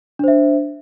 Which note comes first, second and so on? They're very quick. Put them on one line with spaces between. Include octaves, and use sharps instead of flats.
D4 C5 E5